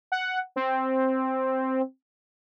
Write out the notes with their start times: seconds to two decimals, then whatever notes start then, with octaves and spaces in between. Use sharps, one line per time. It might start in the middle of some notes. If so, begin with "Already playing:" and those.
0.12 F#5
0.56 C4